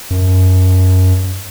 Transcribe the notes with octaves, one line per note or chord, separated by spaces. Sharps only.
F#2